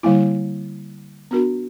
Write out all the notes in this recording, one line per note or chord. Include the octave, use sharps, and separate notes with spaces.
D3 G3 A#3 E4
B3 D4 F#4 A#4